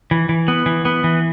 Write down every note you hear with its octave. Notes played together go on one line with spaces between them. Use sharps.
E3
E3
B3
E3
B3
E3